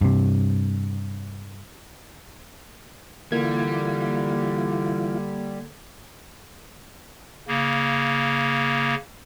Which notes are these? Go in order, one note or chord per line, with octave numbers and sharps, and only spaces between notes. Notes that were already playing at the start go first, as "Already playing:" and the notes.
G2 C3
D3 E3 G3 A#3 F4 G#6
C#3 A#3